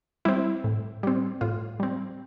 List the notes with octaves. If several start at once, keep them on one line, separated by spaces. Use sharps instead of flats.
G3 C4 E4
A2
G3 C4
A2 F4
G3 C4